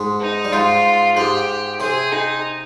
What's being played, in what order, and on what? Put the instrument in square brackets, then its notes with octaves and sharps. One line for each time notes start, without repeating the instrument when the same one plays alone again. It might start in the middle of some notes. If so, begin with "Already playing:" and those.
Already playing: [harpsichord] G#2 G#3
[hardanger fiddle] D#4
[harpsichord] G3
[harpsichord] G#2 G#3 [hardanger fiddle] F4
[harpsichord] G#2 G#3 [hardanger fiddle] G4
[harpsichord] C3 C4 [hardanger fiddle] G#4
[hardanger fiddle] D#4